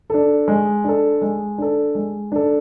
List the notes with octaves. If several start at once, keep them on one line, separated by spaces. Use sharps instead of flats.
D4 A4
G#3
D4 A4
G#3
D4 A4
G#3
D4 A4